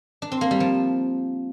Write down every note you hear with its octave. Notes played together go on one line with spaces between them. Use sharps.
D4
C4
A#3
G3
F3